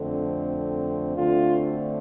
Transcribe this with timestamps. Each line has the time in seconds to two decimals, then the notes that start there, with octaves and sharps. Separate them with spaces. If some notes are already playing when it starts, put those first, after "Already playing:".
Already playing: F2 D3 A3 C4
1.16 D2 D3 A3 C4 F4